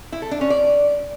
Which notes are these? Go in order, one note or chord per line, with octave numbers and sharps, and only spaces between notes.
E4
A4
D4
C#4
D5